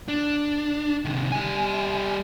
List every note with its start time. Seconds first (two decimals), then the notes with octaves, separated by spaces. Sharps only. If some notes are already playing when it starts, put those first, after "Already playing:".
0.08 D4
1.05 C3 D#3
1.32 G3 G#5